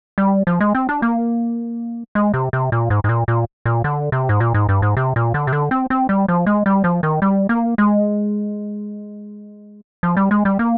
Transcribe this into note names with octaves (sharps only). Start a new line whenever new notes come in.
G3
F3
G#3
C4
D4
A#3
G#3
C3
C3
A#2
G#2
G#2
A#2
A#2
A#2
D3
C3
G#2
A#2
G#2
G2
G#2
C3
A#2
D3
C3
D3
C4
C4
G3
F3
G#3
G3
F3
D#3
G3
A#3
G#3
F3
G3
G#3
G3
A#3